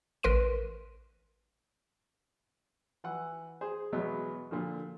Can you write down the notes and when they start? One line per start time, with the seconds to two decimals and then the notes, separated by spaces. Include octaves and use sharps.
0.23 A1 A#4 B4 C6 D7 D#7
3.04 E3 F#5
3.61 G#4 C5
3.92 E2 B2 F#3 G#3 B3 D#4
4.51 A#2 D3 F3